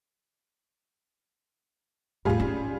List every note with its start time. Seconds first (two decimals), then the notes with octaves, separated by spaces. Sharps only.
2.25 E2 A2 G3 F4 G#4
2.40 C#4 D#4